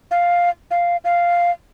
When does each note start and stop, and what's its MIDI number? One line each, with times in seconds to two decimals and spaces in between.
0.11 0.50 77
0.71 0.97 77
1.05 1.51 77